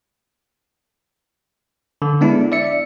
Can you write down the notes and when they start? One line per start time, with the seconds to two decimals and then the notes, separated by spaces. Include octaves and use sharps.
2.02 D3
2.21 G#3 B3 D4 E4
2.52 D5 E5 C#7